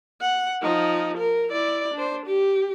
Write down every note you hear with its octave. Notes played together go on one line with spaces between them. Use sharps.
F#5
F3 D#4
A#4
E4 D5
D4 C5
G4